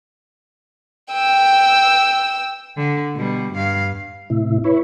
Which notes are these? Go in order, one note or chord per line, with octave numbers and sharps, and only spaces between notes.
G5 E6
D3
B2 G3
G2 F5
A2 C3 E4
E4 B4 C#5